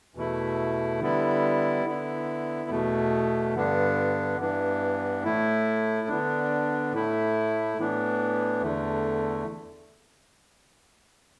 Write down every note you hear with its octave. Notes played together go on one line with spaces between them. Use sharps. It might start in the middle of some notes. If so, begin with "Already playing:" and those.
E2 B2 A3 E4
D3 G3 B3 E4
D3 B3 E4
E2 B2 A3
G2 D3 B3 D4
G2 E3 B3 D4
A2 A3 E4
D3 B3 D4
A2 A3 E4
A2 E3 B3 D4
E2 D3 A3